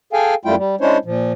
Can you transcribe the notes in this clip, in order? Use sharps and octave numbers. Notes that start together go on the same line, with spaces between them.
G#4 A4 F5 G5 G#5
F#2 G3 A3 E4 F4 G5
G3
G#3 C#4 D4 E4 C5 C#5
A#2 F3